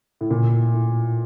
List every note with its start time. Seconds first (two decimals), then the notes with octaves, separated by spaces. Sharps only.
0.21 A2
0.30 A#2
0.74 A2